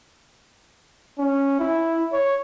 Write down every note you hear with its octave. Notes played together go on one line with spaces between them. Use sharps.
C#4
E4
C#5